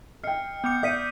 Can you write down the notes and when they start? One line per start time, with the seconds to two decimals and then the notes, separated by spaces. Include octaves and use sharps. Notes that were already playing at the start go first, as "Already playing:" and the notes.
0.23 D#5 G5 F6 C7 C#7
0.64 B3 D6 F6 G6 C#7
0.83 D5 D#6 G6 B6 C7 D#7